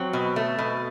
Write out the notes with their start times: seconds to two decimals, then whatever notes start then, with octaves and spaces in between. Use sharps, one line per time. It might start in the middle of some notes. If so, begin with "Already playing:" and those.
Already playing: F#3 C4
0.13 B2
0.36 A3
0.59 B2